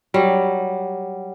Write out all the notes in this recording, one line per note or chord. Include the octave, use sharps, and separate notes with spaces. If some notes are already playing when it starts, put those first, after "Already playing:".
F#3 G3